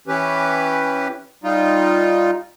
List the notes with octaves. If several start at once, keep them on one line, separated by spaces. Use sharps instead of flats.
E3 C#4 G4 B4
G3 D#4 F4